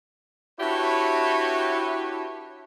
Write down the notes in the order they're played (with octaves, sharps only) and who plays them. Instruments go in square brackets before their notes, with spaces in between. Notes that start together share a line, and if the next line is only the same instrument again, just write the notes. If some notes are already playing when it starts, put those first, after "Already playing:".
[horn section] D4 E4 F#4 G4 B4 C#5